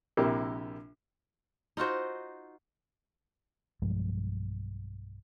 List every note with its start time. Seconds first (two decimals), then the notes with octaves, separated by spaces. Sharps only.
0.17 A#1 C3 A#3 E4 G4
1.77 D#4 F4 F#4 C5
3.82 B1 G2 F3 G#3